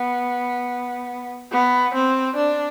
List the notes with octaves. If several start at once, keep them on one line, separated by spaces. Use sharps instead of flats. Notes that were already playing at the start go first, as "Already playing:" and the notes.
Already playing: B3
B3
C4
D4